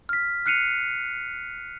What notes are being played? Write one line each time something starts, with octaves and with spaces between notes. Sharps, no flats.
F6 B6
F6 F#6 C7 C#7 D#7 F7